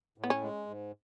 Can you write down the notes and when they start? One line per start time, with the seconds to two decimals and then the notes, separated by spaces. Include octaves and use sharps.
0.18 A2
0.24 B3
0.30 C#4
0.41 G#3
0.66 G#2